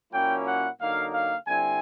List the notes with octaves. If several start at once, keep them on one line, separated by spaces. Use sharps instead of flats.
A#2 F#3 A#3 C#4 E4 G5
F#5
D3 F#3 A#3 D#4 F5
F5
D3 G3 C4 E4 G#5